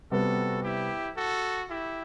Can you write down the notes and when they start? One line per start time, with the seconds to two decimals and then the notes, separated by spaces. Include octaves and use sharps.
0.11 C3 G3 B3 F#4 A4
0.63 E4 G4
1.16 F#4 A4
1.69 E4 G4